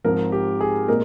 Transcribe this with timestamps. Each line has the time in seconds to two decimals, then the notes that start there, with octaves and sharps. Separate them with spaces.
0.04 G#2 F3 C4 A#4
0.32 G4
0.60 G#4
0.88 A#2 G#3 C4 A#4